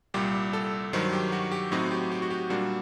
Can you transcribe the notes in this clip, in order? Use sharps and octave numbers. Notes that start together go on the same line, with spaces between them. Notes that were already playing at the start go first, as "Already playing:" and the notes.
C2 A#2 G3 G4
A4
G2 D#3 F#3 C5
G4
F#4
G4
A2 F#3 C4 D#4 F#4
G4
G4
F#4
G4
A#2 G3 A#3 D4 F#4